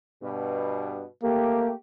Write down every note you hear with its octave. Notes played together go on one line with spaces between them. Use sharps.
G2 B2
A3 A#3 G4